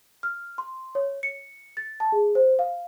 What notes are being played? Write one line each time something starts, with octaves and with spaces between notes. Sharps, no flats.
F6
C6
C#5
C#7
A6
A5
G#4
C5
F5